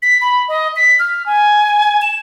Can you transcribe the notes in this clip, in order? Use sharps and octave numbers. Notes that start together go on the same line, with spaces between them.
B6
B5
D#5
B6
F6
G#5
E7